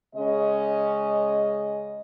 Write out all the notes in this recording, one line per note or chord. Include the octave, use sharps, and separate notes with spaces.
C#3 G#3 C#4 D#5